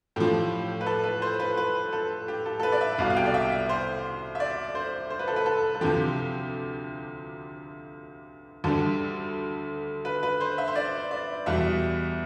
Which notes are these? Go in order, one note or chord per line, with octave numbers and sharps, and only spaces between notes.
A2 F3 G4
B4
A4
B4
C5
B4
B4
A4
G4
A4
A4
B4
D5
E5
C2 B2 G3 F5
F5
G5
D5
E5
E5
C5
E5
D5
C5
C5
B4
A4
B4
A4
A4
D2 C3 F3 G4
D2 D3 G3 A4
B4
B4
C5
E5
C5
D5
D5
E2 B2 G3 E5